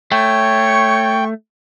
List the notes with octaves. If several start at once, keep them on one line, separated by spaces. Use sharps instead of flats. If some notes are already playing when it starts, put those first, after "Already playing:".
A3 C#5 G5 C#6